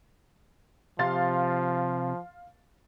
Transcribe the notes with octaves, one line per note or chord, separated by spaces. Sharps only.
C3 F3 F5 C6 A6